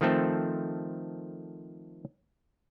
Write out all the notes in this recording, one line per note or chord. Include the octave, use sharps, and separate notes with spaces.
D#3 F3 A3 C4 A4